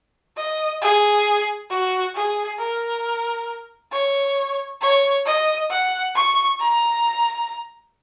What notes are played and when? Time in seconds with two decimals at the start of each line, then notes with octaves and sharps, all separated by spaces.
0.36 D#5
0.81 G#4
1.70 F#4
2.15 G#4
2.58 A#4
3.92 C#5
4.81 C#5
5.26 D#5
5.70 F#5
6.15 C#6
6.59 A#5